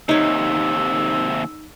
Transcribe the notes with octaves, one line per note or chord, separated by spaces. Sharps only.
D#2 C3 D#4 C#5 E6